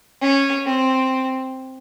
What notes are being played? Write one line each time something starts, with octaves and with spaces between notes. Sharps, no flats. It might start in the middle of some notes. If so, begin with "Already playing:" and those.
C#4
C4